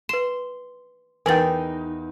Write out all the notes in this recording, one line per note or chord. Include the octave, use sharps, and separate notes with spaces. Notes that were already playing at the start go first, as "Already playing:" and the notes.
B4 C6 E7
E2 D#4 A#4 B4 G5 G#5 A6